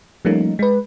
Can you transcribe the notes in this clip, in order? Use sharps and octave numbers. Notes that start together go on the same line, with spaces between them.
F3 G3 A3 A#3 C#4 D#4
G#3 B4